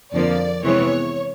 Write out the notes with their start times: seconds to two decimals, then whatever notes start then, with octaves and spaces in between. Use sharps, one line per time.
0.13 F2 D3 F3 A#3 D5
0.63 C3 E3 G#3 B3 C#5